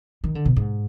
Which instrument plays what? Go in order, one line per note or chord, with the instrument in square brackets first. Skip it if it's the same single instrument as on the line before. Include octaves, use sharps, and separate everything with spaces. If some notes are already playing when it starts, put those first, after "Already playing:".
[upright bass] D#3
D3
B2
G#2